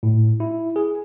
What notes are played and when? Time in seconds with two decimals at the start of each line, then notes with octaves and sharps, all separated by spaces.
0.03 A2
0.40 E4
0.76 G#4